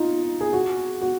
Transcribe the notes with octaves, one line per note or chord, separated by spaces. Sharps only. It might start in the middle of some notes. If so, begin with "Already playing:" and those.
Already playing: D#4 F4
G#4
F#4
F#4